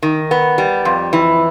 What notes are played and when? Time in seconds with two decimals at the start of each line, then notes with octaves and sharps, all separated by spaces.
0.02 D#3
0.31 B3
0.58 G3
0.85 F2
1.13 E3